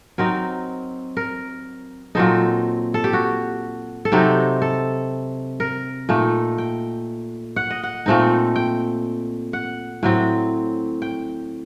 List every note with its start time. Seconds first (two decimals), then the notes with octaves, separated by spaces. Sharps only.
0.18 F#3 C4 D#4 A#4
1.17 A#4
2.15 A#2 F#3 C4 D#4 A4
2.94 A4
3.04 G4
3.13 F#4
4.05 A4
4.12 C3 F#3 C4 D#4 G4
4.62 A4
5.60 A#4
6.09 A#2 A3 D#4
6.58 G5
7.56 F#5
7.70 D#5
7.83 F#5
8.06 A#2 A3 C4 D#4
8.56 G5
9.53 F#5
10.03 A2 F#3 C4
11.02 G5